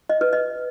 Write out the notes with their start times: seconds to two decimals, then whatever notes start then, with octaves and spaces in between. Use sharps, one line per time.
0.09 D#5
0.21 B4
0.33 D#5